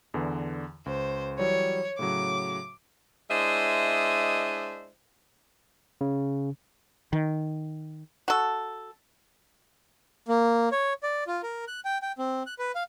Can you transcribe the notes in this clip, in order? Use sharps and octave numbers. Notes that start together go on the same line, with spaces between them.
E2 D3 E3
C#2 C5
E3 F#3 G3 C#5
A2 C#3 F#3 D6
G#3 D4 E4 C5 D#5 E5
C#3
D#3
F#4 A4
A#3
C#5
D5
F4
A#4
F#6
G5
G5
C4
F#6
B4
F5